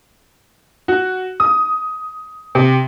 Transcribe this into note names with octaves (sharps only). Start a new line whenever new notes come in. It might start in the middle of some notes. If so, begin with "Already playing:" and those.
F#4
D#6
C3